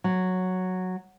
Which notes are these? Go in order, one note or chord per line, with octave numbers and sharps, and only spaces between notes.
F#3